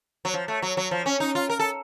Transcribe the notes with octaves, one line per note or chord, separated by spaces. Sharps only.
F#3
F3
A3
F#3
F#3
F3
C#4
D#4
F4
A#4
A4